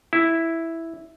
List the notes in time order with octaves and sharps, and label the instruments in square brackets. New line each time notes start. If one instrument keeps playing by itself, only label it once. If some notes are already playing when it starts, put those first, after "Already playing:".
[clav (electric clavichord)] E4